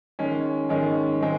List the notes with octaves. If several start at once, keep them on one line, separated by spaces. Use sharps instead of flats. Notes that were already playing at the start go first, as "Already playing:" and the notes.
D#3 G#3 C#4
D#3 G#3 C#4
D#3 G#3 C4